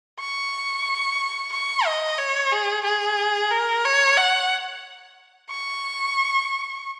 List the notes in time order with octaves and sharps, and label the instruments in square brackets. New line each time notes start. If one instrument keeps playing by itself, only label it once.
[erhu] C#6
C#6
D#5
C#5
G#4
G#4
A#4
C#5
F#5
C#6